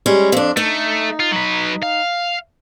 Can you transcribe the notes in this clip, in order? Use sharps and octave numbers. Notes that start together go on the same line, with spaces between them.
G3 G#3 C#4
F2 D4
A3 D#4
F4
F#3 B4
F5